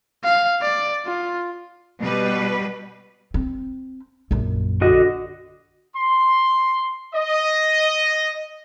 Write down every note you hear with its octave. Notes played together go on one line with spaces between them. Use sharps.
F5
D5
F4
B2 G3 B4
C4
A#1 F#2
D3 F#4 D#5
C6
D#5